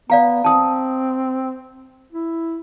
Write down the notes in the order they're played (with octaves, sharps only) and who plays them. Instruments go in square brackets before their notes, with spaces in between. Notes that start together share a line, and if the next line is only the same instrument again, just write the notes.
[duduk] B3 [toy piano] D5 F5 A#5
[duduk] C4 [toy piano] A5 D#6
[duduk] E4